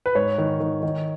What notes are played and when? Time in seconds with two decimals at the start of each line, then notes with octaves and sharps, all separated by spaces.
0.06 B4
0.15 G#2 C#5
0.38 D#3
0.60 D#3
0.83 D#3